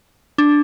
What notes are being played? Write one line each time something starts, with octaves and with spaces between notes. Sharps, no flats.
D4